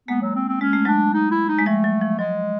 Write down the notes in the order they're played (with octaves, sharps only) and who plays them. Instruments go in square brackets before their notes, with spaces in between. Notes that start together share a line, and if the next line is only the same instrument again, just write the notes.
[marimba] G#3 A#3 [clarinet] B3
[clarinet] F#3
C4
C4
[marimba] G#3 [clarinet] C#4
[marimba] A3
[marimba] F#3 G#3 [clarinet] D4
[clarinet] D#4
E4
D#4
[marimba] G#3
[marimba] F3 G3 [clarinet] A3
[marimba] F#3
F3
[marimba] F#3 [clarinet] G#3